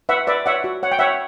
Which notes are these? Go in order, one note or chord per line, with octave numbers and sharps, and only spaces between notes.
B4 E5 F#5
B4 D5 E5
C#5 E5 F#5
F#4
C#5 F#5
G5
C#5 E5 F#5